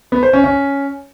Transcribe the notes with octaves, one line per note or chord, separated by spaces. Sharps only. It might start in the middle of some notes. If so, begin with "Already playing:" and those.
B3
C5
C#4
C#4